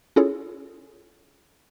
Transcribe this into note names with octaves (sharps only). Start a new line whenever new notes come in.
C#4 E4 F4 G#4 A4 C#5